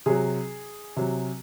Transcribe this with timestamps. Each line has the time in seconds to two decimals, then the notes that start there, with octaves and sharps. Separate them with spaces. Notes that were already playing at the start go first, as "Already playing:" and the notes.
0.06 C3 F#3 G#4
0.96 C3 F#3